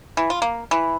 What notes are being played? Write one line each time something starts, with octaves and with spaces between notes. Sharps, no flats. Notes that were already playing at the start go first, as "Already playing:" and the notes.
E3
F4
A#3
E3